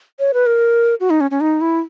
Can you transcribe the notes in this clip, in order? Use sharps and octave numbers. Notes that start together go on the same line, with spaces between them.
C#5
B4
A#4
F#4
D#4
C#4
C#4
D#4
E4